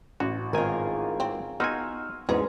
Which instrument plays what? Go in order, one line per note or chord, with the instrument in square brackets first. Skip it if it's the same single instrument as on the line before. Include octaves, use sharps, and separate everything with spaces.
[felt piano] A1 [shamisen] F#3 [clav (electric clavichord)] F#4
[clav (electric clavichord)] G#1 D#3 G#5 [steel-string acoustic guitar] F4 G#4 A#4
[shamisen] C4
[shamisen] B3 [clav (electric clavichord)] D#4 F#4 G#5 [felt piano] C6 E6 F6
[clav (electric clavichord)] E2 G#2 [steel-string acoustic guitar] G#3 C#4 B4 [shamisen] G#4